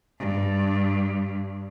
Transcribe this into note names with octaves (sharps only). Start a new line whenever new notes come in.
G2